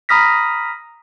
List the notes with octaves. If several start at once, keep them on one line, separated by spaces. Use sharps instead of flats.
A#5 B5 D#6 F6 A#6 B6